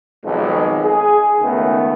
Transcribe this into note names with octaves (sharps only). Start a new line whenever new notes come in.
B1 F2 D#3 G#3
G#4
C#2 D#3 A3 B3